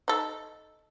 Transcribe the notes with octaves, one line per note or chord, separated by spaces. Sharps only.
D#4 A4